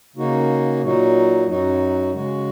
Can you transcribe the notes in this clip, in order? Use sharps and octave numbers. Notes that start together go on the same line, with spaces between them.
C#3 A#3 D#4 F#4
A#2 F#3 D#4 F#4
F#2 F#3 D#4 F#4
C#3 G#3 F#4